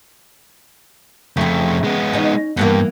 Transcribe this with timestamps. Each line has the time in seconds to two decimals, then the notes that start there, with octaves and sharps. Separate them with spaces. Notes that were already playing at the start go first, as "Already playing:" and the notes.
1.37 F2 C#3 A3 C4
1.84 G#3 B3
2.13 C#4 D#4
2.57 G2 E3 A#3 B3